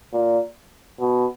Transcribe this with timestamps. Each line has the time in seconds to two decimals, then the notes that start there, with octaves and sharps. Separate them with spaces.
0.13 A#2
1.00 B2